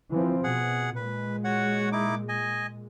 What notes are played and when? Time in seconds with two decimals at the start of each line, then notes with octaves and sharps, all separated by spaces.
0.10 E3 F3 C4
0.44 B2 G#4 F#5
0.96 A#2 G#3 B4
1.44 F#4 C#5 F#5
1.92 D#4 E4 D6
2.29 D#5 G#5